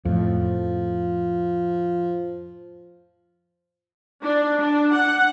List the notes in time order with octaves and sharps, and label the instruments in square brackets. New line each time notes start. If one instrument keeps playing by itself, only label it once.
[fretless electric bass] F2 A2 [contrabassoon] F3
[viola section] D4
D4
F#5